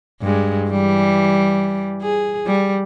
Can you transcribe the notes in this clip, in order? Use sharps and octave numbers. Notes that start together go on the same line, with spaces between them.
G2 G#3
E3 G3
G#4
G3